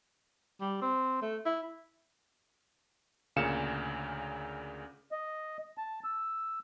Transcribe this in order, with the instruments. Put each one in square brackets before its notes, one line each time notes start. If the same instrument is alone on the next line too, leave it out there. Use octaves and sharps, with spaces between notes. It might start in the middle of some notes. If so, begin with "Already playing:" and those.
[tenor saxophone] G3
C4
A3
E4
[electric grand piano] D2 A#2 C#3 F5 C#7 E7
[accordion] D#5
A5
E6